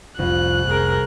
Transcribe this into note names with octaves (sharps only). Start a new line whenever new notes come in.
F1 C2 F2 F4 F#6
F1 G#4 A#4